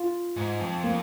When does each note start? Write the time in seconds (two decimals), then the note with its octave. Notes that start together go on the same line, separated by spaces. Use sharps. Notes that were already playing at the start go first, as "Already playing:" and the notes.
Already playing: F4
0.37 G#2
0.60 F2
0.83 A#3